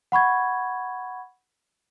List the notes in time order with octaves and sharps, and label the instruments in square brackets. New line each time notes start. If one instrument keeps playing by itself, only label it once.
[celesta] F#5 B5 C#6 G#6